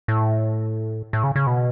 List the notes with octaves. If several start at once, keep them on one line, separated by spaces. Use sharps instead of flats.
A2
A2
C#3
C#3
B2